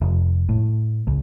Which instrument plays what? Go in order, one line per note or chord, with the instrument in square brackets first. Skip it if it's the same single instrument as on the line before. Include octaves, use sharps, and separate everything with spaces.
[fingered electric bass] F1
A2
C#2